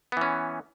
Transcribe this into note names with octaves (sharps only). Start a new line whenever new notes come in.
E3 B3 C#4